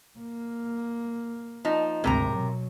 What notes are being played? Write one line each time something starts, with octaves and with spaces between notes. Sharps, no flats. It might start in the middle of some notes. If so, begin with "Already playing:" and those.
A#3
F3 D#4
G#1 D2 C3 A#4 A#5
B2 F#3